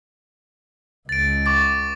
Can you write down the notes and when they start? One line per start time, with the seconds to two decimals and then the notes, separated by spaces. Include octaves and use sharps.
1.09 C#2 A6 D7
1.46 C#6 D6 A6